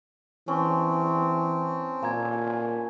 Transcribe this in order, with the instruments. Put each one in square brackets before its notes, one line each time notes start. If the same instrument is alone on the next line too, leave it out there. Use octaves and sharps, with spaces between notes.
[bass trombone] E3 [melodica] C4 [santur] C#4 [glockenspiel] G#5 A5 C#6
[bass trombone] A#2 [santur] A#3 [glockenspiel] G#5 A#5 G#6